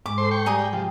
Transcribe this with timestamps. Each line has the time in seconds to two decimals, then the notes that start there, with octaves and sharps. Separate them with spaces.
0.06 G#2 G#3 D6
0.18 A4 C5 C6
0.31 G5 C#6
0.46 G3 G#4 A#5 D#6
0.58 G5
0.73 C3 F3 G5